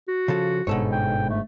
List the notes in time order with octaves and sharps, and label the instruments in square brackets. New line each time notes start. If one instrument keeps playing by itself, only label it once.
[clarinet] F#4
[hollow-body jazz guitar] C#3 F3 A4
[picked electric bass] G1 G#2 [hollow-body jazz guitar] B2 A4 C#5
[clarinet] G5
A3